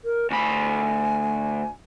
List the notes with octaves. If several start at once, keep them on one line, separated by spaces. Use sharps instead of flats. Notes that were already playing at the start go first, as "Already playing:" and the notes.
A#4
D2 G#5 B5